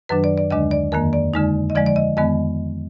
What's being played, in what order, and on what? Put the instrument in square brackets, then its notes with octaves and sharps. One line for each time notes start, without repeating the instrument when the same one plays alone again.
[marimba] F#2 D#3 F#3 D4 B4
D5
D5
D#2 D3 G#3 D4 D#5
D5
F2 D#3 A#3 A#4
D5
F2 D3 G#3 D#4
D#5
D3 F3 G#3 D5
D5
D#5
F2 D#3 G#3 B3 D#5